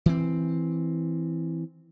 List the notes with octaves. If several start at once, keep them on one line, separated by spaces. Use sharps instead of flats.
E3 C4